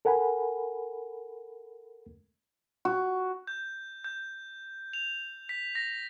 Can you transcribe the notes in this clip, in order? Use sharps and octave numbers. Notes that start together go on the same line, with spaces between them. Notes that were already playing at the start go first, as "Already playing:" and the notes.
A4 A#4 F#5 G#5 B5
F#4
G6
G6
F7
B6
A#6